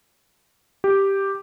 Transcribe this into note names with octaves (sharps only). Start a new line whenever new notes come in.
G4